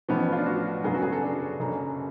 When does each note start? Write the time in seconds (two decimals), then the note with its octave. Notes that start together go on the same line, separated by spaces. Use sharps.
0.09 A1 A2 F3 B3 C#4
0.32 F4
0.38 D4
0.46 F#4
0.84 F#2 C#3 F#3 B3 G#4
0.94 F#4
1.02 G#4
1.12 A4
1.22 D4
1.59 F#1 F#2 C#3